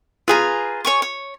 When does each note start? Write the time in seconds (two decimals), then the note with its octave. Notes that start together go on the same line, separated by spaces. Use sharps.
0.28 F4 G#4 B4 G#5 A#5
0.85 C#5 G#5 C#6
1.02 C#5